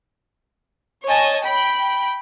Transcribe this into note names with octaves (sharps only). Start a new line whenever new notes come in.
C#5 D#5 G#5 A5
G5 B5